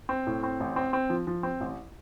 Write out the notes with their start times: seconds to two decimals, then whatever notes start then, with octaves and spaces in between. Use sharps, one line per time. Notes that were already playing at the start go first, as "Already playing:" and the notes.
0.09 C4
0.26 A2
0.43 C4
0.60 A1
0.76 C4
0.93 C4
1.10 F3
1.27 F3
1.43 C4
1.61 A1